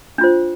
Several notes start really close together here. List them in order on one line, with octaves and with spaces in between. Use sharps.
D4 F4 C5